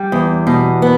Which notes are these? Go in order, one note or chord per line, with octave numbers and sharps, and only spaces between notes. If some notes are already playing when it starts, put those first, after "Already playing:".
Already playing: G3
E2
B2
B3